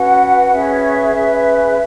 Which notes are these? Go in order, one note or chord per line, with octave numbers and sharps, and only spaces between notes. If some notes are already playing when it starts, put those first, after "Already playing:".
Already playing: C#4 F#4 B4 F#5
C#4 G#4 B4 E5
C#4 G#4 B4